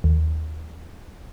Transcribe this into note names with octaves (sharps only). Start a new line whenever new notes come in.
D#2